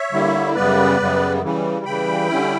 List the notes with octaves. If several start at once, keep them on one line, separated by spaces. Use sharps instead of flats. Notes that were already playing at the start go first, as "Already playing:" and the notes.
Already playing: C#5 E5
D3 G3 A#3 E4
F#2 C#3 G3 B3 B4 D5
F#2 C#3 G3 B3
C#3 E3 G3
C#3 E3 G3 G5 B5
D3 G3 C#4 E4